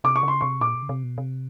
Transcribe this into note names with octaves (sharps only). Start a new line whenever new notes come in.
C3 D6
C#6
C#3 C6
C3 C#6
A#2 D6
B2
C#3
C3
B2
C3